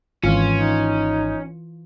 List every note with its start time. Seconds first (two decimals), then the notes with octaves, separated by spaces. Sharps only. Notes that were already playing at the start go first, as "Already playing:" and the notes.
0.24 G#1 E3 C#4 F4
0.59 D#4